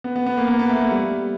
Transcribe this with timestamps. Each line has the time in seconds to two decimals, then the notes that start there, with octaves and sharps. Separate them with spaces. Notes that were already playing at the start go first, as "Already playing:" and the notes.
0.04 B3
0.16 B3
0.26 B3
0.37 A#3
0.48 B3
0.59 B3
0.69 A3
0.80 A3
0.91 G3